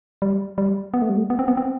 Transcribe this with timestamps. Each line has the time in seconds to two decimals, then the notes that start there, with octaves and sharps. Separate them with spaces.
0.22 G3
0.58 G3
0.94 B3
1.02 A3
1.09 G3
1.18 A3
1.30 B3
1.39 C4
1.48 B3
1.57 C4